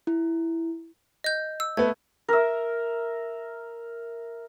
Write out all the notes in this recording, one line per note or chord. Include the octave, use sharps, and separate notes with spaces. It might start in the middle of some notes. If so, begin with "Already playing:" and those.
E4
D#5 G6
E6
A3 B3 G#6
A#4 E5